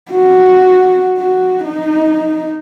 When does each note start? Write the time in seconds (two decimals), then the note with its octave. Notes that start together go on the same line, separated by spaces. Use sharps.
0.11 F#4
1.18 F#4
1.64 D#4